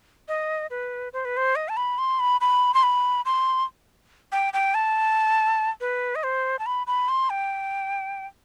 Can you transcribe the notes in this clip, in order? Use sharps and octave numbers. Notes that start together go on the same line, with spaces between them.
D#5
B4
C5
B4
C5
D#5
A5
B5
C6
B5
B5
C6
B5
C6
G5
G5
A5
B4
D#5
C5
A5
B5
B5
C6
G5